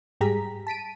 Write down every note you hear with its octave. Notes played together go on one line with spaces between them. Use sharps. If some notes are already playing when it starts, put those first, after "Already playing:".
G#2 G3 G4 G#4 A#5 B6
A5 B6 D7 D#7